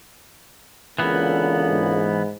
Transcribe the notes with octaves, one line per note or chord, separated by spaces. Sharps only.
C#2 D3 E3 A#3 B3
G#2